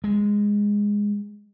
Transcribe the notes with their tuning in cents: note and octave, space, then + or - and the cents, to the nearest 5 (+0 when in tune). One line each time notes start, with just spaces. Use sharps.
G#3 -10